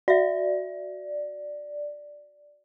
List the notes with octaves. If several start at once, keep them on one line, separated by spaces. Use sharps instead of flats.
F#4 D5 E5